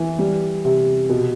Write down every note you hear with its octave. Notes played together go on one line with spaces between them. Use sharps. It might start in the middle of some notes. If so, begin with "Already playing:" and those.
Already playing: E3
G3
C3
B2